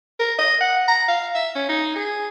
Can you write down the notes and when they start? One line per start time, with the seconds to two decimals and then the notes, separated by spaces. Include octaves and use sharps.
0.19 A#4
0.39 D#5
0.61 F#5
0.88 A#5
1.08 F5
1.35 E5
1.55 C#4
1.69 D#4
1.95 G#4